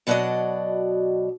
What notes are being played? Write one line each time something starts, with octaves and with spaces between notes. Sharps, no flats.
B2 F#3 D4 F#4 D5 D#5